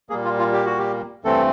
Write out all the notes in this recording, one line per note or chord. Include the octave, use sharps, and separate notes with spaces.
A#2 G3 A#3 G#4
F4
F4
G4
F#4
G4
G2 E3 A3 C4 A4